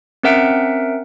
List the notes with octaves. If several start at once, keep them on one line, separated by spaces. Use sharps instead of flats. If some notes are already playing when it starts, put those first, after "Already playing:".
C4 C#4 A#4 E5 F#5 D7